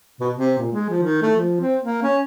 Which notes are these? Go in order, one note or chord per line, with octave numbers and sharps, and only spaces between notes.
B2
C3
A#2
G#3
F3
D#3
A3
F3
C4
A#3
C#4